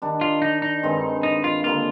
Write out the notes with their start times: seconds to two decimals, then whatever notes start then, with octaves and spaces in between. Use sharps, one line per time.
0.02 D#3 G3 D4
0.21 F4
0.42 D#4
0.62 D#4
0.83 G2 D#3 G#3 C4
1.23 D#4
1.44 F4
1.64 D3 G3 A#3 F4